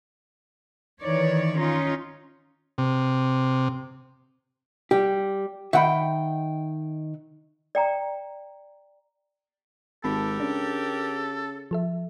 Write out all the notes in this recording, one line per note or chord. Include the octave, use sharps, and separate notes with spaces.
D#3 E3 C#5 D5
C#4 D#4 F4
C3
G3 G4
D#3 E5 F#5 G5 B5
D5 G5 A#5
G#1 G4 A4 A#4 A5 B5
C#3 D4
F3 A4 E5